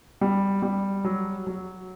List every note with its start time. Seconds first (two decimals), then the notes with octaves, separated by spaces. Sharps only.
0.21 G3
0.62 G3
1.05 F#3
1.47 F#3